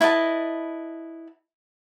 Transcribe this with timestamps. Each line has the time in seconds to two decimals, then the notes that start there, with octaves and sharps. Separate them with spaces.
0.01 E4 B4 D#5 A5